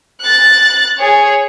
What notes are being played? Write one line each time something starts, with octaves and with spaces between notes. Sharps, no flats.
F#6 A6
G#4 C#5